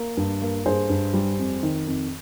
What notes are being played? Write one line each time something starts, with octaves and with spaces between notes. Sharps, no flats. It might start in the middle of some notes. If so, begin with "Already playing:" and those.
Already playing: A#3
G2
A#3
G2 G#4 C5
G2
G3
F2
D#3
F2